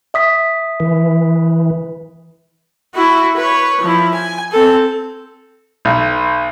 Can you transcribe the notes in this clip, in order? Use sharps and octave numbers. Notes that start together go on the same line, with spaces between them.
E5 D#6 B6
E3
E4 F#4
B4 C#5
F3 E4
G#5
C4 A4
B1